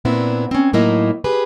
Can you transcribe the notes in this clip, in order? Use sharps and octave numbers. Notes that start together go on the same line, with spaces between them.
A#2 B3 C4 D4 E4
C4 C#4
A2 F#3 A#3 D#4 E4 D#5
G4 G#4 B4